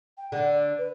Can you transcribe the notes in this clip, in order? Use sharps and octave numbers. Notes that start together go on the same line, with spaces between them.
G5
D3 F#5
D5
B4